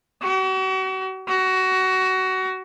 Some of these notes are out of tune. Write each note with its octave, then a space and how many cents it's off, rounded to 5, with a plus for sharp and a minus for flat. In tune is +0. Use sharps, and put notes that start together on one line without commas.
F#4 +40
F#4 +20